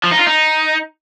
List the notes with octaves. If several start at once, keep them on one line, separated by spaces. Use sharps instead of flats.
F3
D#4
F4
D#4